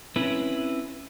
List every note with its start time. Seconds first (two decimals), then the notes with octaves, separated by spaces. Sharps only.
0.16 C4 C#4 E4 B4